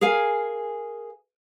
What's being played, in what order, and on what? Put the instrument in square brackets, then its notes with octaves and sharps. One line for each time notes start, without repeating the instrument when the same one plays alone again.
[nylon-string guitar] G#4 A#4 F5 G#5